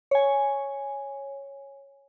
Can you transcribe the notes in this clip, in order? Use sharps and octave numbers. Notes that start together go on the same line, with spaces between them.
C#5 G#5